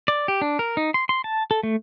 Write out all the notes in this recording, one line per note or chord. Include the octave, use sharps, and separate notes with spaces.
D5
G4
D4
A#4
D#4
C6
C6
A5
A4
A3